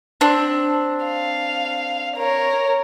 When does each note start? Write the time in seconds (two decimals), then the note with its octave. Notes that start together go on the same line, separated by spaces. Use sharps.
0.21 C4 D4
1.05 F5
2.17 A#4 C#5